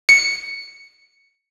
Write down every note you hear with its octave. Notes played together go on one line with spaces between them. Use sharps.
C#7